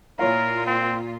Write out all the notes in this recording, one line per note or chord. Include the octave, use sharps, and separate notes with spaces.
A#2 E4 F4 A#4 C#5 F5
C4